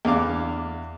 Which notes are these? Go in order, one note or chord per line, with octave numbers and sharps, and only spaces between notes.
E2 D4 F5 D6